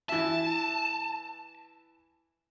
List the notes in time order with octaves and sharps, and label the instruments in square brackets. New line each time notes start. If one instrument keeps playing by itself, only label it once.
[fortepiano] E3 E5 [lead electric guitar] A5